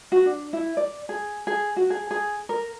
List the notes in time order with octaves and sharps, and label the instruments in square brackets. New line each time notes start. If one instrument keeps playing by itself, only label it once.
[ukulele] F#4
D4
E4
D5
G#4
G#4
F#4
G#4
G#4
A#4